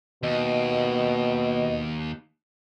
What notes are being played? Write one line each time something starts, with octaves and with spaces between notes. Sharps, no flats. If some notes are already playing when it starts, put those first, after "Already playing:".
D#2 B2 D#5